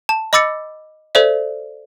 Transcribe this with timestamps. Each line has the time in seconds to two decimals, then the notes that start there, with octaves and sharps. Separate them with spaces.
0.09 A5
0.33 D#5 B5 D6 E6 A6 C#7
1.15 A4 C5 D5 E5